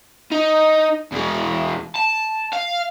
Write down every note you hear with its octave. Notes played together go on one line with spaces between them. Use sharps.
D#4
E2 G#3
A5
F5